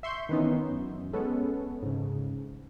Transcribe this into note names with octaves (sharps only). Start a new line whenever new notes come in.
E5 C6 C#6 G6
D#3 E3 B3 C#4 D#4
F#2
G#3 B3 C#4 A4
G#2 C#3